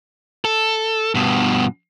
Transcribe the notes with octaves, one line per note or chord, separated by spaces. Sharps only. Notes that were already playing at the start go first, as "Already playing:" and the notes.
A4
G2 B2